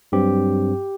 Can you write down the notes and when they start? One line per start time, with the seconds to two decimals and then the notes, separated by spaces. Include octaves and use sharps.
0.12 G2 F#3 C4 G4